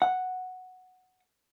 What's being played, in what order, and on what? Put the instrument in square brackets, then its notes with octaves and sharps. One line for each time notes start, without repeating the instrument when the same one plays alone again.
[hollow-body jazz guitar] F#5